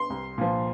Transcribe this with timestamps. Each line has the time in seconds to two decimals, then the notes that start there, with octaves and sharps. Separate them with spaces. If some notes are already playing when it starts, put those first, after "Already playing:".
Already playing: C6
0.10 C2
0.38 A#2 F3